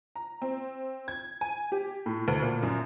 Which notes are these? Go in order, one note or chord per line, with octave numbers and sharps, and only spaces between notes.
A#5
C4
G#6
G#5
G4
A2
D2
A#2
F#2